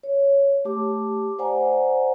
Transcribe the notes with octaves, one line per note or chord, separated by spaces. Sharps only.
C#5
A3 G4 A5 D6
C5 D5 F#5 G#5 A#5